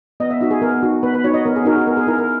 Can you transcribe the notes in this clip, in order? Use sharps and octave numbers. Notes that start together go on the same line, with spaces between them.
B3 D#5
E5
D#4 F#4 E5
G#4
B3 A#4
D#4 F#4
B3 B4
B4
D#4 F#4 C#5
D#5
B3 A#4
G#4
D#4 F#4 A#4
G#4
B3 A#4
G#4
E4 A#4
A#4